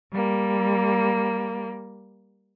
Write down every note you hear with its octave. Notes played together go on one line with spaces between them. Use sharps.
G3 A#3